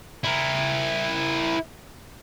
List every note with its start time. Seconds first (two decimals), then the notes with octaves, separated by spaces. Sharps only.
0.24 E4 A#4